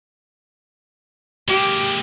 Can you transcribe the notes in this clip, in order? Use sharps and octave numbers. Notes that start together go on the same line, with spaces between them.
G#3 A#3 G4